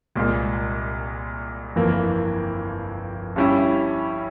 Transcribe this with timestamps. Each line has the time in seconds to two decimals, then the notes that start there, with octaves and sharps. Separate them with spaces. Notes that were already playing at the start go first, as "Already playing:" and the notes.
0.15 C2 A#2 G#3
1.76 G1 F2 E3 A#3
3.36 G2 G3 C#4 E4